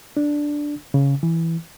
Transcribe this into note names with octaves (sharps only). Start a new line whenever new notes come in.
D4
C#3
E3